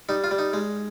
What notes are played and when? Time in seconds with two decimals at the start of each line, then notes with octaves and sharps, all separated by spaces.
0.09 G3 D#4
0.24 F4
0.31 G3
0.39 D#4
0.53 G#3